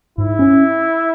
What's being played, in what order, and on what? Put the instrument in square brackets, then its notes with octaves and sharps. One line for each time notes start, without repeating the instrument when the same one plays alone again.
[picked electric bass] G#2 [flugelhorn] E4
[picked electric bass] C#4